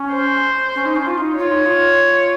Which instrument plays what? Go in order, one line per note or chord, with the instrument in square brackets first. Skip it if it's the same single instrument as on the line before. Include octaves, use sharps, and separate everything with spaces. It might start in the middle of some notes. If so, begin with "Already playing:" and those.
Already playing: [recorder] C#4
[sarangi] C5
[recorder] C#4
D#4
C#4
F4
D#4
[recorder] F4 [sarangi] C#5
[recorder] D#4
F4